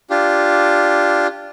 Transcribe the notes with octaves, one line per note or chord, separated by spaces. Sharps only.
D4 F4 G4